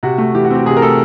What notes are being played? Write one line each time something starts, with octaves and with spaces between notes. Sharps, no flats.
C3 F#4
A3
E3 G4
F#4
C4 G4
C3 G#4
A#4
A3 A4